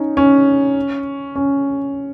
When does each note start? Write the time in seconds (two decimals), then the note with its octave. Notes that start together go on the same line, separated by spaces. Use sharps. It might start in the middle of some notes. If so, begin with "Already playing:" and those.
Already playing: C#4 D#4
0.17 C#4
1.36 C#4